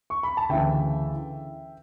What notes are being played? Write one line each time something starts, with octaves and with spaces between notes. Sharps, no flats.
C#6
B5
A5
D2 C#3 E3 E5 G5